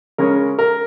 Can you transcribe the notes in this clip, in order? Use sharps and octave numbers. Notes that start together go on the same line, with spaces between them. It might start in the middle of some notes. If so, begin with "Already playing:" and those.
C#3 G#3 C#4 A#4
A#4